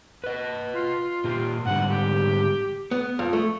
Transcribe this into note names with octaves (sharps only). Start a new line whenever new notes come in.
B4 D#5
F4
A#2 G4
G#2 D3 G3 F#5
G4
B3
F2
A3